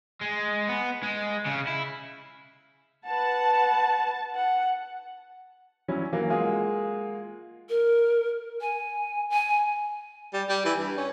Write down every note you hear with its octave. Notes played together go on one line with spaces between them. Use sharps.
G#3
B3
G#3
C#3
E4
B4 F#5 A5
F#5
F#3 G3 C#4 E4
E3 F#3 A#3
G#3 A#3 F4 F#4 G#4
A#4
G#5
G#5
G3
G3
E3
G2
C#4